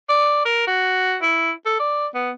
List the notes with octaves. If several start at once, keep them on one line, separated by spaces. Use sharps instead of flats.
D5
A#4
F#4
E4
A4
D5
B3